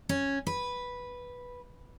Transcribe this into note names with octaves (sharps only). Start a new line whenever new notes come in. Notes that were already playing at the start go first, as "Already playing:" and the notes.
C#4
B4